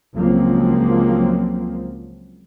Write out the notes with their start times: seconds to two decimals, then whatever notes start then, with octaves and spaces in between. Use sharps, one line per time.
0.15 C#2 F3 F#3 A#3 C4